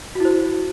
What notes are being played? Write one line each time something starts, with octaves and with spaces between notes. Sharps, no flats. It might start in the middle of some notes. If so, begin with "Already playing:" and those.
E4 F#4 C5